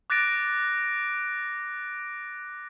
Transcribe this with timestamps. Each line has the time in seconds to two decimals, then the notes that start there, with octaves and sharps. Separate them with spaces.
0.10 D6 F#6 A6 A#6 D7